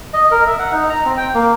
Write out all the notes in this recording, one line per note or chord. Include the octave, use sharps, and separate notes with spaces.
D#5
A#4
E5
F#5
D#4
A#5
C4
G5
A#3